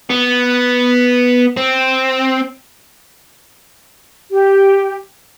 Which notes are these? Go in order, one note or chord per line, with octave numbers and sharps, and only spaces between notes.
B3
C4
G4